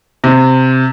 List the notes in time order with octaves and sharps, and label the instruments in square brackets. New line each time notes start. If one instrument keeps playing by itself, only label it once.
[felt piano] C3